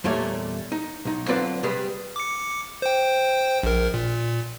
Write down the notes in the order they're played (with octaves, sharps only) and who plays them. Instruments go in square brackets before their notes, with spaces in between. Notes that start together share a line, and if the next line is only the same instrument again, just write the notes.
[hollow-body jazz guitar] E2 A#2 G3 A3 C#5
D#4
B1 D#4
D3 F#3 C4 F4 B4 D5
C3 G3 G#4 B4
[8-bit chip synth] D6 C#7
C5 G5
A#1 A#4
A#2